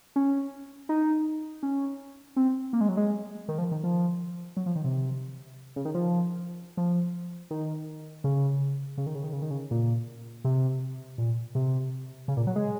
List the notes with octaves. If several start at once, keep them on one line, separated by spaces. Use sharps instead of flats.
C#4
D#4
C#4
C4
A#3
G#3
F#3
G#3
D#3
F3
D#3
F3
F#3
F3
D#3
C3
C#3
D#3
F3
F3
D#3
C#3
C#3
D#3
C#3
D#3
C#3
D#3
C#3
A#2
C3
A#2
C3
C#3
A#2
F#3
G#3